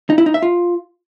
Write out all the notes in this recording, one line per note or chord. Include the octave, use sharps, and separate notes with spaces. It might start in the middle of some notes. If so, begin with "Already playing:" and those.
D#4
E4
D#4
E5
F4